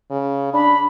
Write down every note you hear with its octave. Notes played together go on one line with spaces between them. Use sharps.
C#3
D4 B5